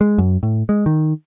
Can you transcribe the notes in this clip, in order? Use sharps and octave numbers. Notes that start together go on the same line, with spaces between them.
G#3
F#2
A2
G#3
D#3